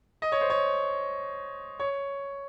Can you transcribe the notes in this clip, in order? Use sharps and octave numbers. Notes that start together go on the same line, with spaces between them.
D#5
C#5
C5
C#5
C#5